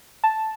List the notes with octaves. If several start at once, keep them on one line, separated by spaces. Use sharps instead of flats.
A5